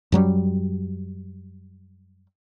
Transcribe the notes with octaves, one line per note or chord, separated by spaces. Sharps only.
F#2 F#3 G3